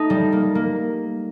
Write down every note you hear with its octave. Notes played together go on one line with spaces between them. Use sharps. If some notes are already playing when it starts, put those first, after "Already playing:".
Already playing: A3 D#4
G3
A#3
A#3